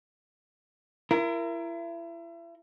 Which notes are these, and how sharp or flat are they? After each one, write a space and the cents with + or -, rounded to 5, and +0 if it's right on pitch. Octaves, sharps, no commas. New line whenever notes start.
E4 +35 A#4 +0